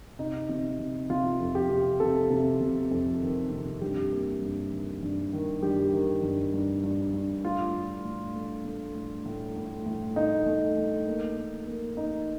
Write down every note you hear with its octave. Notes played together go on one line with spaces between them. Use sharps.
C3 D#4
C3
C3
C3 F4
F2
G4
C3
C3 A4
C3
C3
F2
D#3
C3
G2 G4
A#3
G2
D#3
G2
D#3
G2 G4
D#3
G2
G2
G2
G2
A2 F4
A2
A2
A3
A3
A2
A2
A2
A2
A3 D#4
A3
A3
A#3
A#3
A#3
A#3 D#4